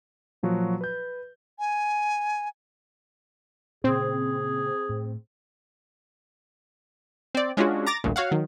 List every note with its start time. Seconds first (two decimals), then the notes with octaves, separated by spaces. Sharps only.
0.43 A#2 F3 F#3 F#4
0.81 B4 G6
1.59 G#5
3.84 A#2 C#3 C4 G#4
4.89 A2
7.35 C4 D5
7.57 G#3 C#4 D4 F4 F#4 G#4
7.87 A#5 D6 A6 A#6
8.04 A1 D2 G2 A#2
8.16 F#4 C#5 F5 F#5
8.31 D#3 F#3